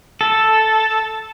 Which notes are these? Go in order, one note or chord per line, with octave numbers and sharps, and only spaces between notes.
A4